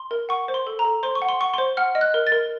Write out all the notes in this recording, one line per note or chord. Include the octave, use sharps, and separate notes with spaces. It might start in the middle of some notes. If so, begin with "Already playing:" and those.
Already playing: C6
A#4
F#5 C#6
C5
C6
A4
A#5
A4
C5 C6
C#6
F#5
C6
F#5 C#6
C5 C6
F#5 F6
D#5
F#6
A#4
A6
A#4